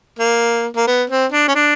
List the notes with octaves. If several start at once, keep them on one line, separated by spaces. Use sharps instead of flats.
A#3
A#3
B3
C4
D4
C#4
D4